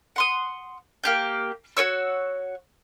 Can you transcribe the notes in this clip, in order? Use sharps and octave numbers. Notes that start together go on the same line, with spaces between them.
F#5 C6 D#6
A#3 G4 G6
F#4 B4 C#5 E6